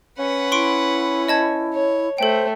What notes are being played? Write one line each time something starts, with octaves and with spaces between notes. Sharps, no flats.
C#4 B4 F#5
E4 C6 C#6 D7
D#5 A5 G#6
C#5
A3 A4 C5 G5